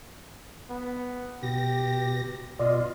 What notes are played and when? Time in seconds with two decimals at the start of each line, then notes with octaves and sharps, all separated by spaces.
0.70 B3
1.43 B2 G4 A#6
2.59 B2 F4 D5 D#5